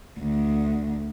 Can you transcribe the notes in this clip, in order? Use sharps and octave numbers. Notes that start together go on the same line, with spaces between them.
D2